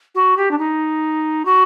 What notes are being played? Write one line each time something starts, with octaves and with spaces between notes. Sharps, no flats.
F#4
G4
D4
D#4
F#4